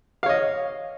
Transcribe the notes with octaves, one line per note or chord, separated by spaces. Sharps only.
C#5 D#5 F5